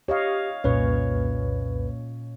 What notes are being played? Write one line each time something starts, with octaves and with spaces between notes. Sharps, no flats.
G4 C#5 D#5 F5
C2 F2 A#2 C#4 B4 C#5